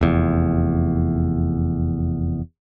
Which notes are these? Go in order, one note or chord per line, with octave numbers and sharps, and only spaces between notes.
F1 E2